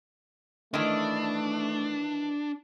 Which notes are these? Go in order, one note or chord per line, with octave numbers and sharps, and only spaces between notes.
D#3 E3 A3 D4